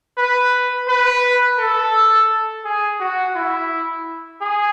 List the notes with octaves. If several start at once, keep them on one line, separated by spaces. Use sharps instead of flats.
B4
B4
A4
G#4
F#4
E4
G#4